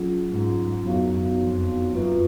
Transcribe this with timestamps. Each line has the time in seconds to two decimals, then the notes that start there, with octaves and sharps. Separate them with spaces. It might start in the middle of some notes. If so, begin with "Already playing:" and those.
Already playing: F#3 C#4 F4 G#4
0.31 G#2
0.85 F#2 B3 D#4 F#4 C#5 F5
1.40 F2
1.93 F#2 A#3 F4 B4